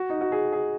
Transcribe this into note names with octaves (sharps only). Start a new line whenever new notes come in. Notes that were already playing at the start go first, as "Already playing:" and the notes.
Already playing: F#4
D#4
F#4
G#4
G#4